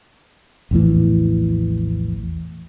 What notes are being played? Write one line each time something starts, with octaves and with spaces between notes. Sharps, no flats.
A#1 E2 A2 E3